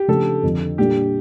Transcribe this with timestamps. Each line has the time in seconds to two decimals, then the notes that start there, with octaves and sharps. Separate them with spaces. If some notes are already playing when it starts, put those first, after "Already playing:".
Already playing: G4
0.08 C#3 F3 A3 D4 A4
0.43 F2 D3 F3
0.78 A#2 G3 D4 F4 G4